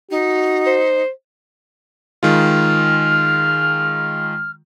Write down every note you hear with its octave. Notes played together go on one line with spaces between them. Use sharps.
D#4 F#4
C5
D#3 G#3 F4 F6